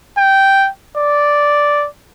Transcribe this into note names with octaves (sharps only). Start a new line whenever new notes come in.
G5
D5